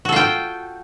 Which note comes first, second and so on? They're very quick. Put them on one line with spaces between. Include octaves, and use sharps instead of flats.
F#4 A4 F4 G5